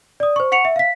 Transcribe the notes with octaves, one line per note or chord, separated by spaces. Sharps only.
D5 D#6
C5 C#6
F#5 C#6 C#7 F7
E5
F5 B6